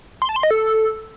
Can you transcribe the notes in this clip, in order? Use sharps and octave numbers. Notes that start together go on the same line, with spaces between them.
C6
A5
C6
D#5
A4